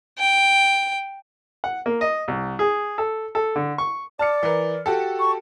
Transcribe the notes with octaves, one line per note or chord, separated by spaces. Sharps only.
G5
F#5
A#3
D#5
C2
G#4
A4
A4
D3
C#6
D5 A5 F6 C#7
E3 A#4
F#4 G4 A4
C#6